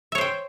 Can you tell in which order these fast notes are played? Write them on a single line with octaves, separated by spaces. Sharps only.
E5 C#5 C5 G5